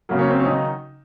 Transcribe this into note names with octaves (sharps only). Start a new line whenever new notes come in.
C#3 F#3 A#3
C#4
C4
C#4
D#3 D#4